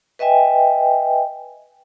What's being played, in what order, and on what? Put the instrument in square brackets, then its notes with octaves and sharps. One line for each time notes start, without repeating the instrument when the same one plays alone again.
[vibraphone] B4 D#5 E5 G5 G#5